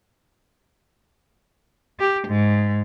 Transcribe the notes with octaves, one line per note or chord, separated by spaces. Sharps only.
G4
G#2